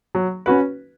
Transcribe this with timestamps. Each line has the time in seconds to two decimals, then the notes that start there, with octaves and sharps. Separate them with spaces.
0.15 F#3
0.46 C#4 F#4 B4